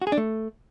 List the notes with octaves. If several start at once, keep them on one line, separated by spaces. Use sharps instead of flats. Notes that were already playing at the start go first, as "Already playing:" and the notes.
F#4
G#4
D4
A3